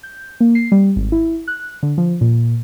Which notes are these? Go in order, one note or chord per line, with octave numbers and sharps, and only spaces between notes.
G6
A#3
C7
G3
G#1
E4
F#6
D3
F3
A#2